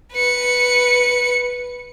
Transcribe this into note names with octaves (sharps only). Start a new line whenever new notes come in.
B4 C#7